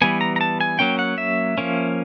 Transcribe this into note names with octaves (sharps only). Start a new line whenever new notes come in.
E3 G3 B3 G#5
A#5
A#5
A5
G#5
F#3 A#3 C#4 G5
F#5
E5
F3 A#3 C#4